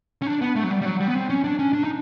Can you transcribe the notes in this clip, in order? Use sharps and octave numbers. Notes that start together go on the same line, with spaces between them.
C#4
D4
B3
A3
F#3
G3
G3
F#3
G3
B3
C4
C#4
D4
C#4
D4
D#4